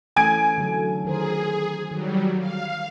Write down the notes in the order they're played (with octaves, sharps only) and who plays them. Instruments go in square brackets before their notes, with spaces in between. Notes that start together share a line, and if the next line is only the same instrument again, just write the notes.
[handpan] E3 A3 C#4 [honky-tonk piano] G#5 G#6 D7
[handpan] D3 F#3 A4
[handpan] D#3 A#4 C5 [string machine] G#4
[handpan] D#3 [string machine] F#3 G3
[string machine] F5